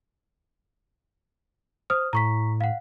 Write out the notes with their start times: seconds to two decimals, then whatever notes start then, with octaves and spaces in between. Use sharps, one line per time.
1.90 C5 D#6 F6
2.13 A2 A#5 C#6 B6
2.61 F5 F#5